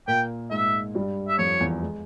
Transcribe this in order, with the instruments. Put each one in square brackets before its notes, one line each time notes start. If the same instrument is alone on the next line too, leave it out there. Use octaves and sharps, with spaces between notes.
[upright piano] A#2 A#3 [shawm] G5
[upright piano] G#2 G#3 [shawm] E5
[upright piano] G2 G3
[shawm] E5
[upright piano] F2 F3 [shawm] C#5
[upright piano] E2 E3
G#3